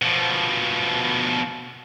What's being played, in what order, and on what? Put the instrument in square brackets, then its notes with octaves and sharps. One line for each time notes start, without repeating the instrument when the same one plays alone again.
[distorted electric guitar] B2 F3